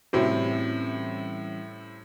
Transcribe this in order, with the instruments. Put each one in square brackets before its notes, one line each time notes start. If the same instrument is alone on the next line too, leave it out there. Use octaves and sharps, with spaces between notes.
[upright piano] A2 C3 C4 [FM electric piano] E3 G3 C#4 [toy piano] F#4